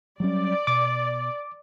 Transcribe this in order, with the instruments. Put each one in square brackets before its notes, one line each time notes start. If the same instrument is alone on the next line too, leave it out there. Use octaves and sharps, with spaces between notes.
[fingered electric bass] F#3 G3 C#4 [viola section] D5
[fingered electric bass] B2 [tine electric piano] D6